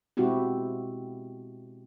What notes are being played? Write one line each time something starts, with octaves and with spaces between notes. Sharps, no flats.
B2 G#3 C4 E4 F#4 G4